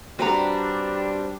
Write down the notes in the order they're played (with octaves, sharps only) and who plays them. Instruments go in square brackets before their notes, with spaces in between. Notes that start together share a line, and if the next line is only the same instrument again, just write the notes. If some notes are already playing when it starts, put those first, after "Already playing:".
[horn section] G3 D4 [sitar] C4 B4 [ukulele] F#4 A#5